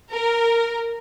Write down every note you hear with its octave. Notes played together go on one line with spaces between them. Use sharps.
A#4